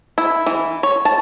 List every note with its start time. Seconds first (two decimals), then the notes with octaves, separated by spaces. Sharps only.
0.18 E4
0.46 E3
0.83 C#5
1.05 A5